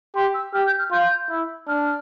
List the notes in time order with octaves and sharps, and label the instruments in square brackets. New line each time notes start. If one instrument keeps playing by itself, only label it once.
[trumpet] G4 [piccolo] C6
[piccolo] E6
[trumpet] G4 [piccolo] F6
[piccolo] G6
F6
[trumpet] F4 [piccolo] G6
[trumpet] E4
[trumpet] D4 [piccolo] F6